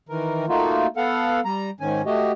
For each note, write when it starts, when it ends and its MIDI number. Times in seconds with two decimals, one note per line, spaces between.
0.09 0.46 51
0.09 0.46 52
0.09 0.46 70
0.49 0.87 57
0.49 0.87 58
0.49 0.87 63
0.49 0.87 65
0.49 0.87 66
0.97 1.40 59
0.97 1.40 69
0.97 1.40 77
0.97 1.40 78
1.45 1.70 55
1.45 1.70 82
1.80 2.02 44
1.80 2.02 51
1.80 2.02 61
1.80 2.02 80
2.06 2.32 57
2.06 2.32 66
2.06 2.32 67
2.06 2.32 75